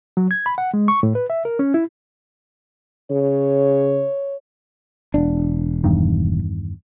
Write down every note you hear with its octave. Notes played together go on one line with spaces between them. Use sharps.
F#3
G#6
B5
F#5
G#3
C#6
A2
B4
E5
A#4
C#4
E4
C#3 C#5
E1 D4
E2 G2 D#3